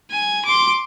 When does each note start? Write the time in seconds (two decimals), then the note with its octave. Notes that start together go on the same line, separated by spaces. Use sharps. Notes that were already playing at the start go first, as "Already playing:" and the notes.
0.11 G#5
0.45 C6 D6